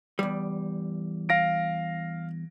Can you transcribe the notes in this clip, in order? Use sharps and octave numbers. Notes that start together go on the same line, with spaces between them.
E2 G3
F5 A#6 D7